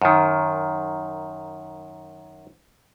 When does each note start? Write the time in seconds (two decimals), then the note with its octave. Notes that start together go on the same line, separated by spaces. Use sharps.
0.02 F#2 D#3